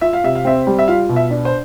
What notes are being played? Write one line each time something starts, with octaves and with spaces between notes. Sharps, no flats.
F4 E5
F5
C3 E5
F5
C4 E5
G3
E5
F4 F5
B2
E5
D4
C5